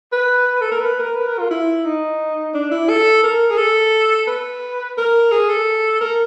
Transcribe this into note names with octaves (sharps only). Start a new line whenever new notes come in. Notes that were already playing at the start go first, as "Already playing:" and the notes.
B4
A4
A#4
B4
A#4
B4
A#4
F4
E4
D#4
D4
E4
A4
A#4
G#4
A4
B4
A#4
G#4
A4
A#4